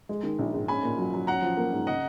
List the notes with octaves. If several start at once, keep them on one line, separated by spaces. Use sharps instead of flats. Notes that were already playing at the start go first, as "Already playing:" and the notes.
G#3
D#3
A#1
G#2
C#4 G#5 B5
A#2
F#3
F#3
C#4 F#5 A#5
F3
A#3
G#2
C#3 D#5 F#5